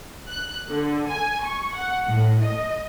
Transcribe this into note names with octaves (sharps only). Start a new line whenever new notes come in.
F#6
D3
G#5
C#6
F#5
A2
D#5